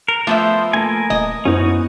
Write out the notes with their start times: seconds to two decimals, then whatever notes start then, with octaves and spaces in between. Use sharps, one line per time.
0.08 A#4
0.27 F3 A3 B3 C5 E5
0.73 A3 A#3 A#4 G#5 A5
1.10 D#1 D#5
1.45 F#2 B3 C#4 D#4 E4 F#4 C5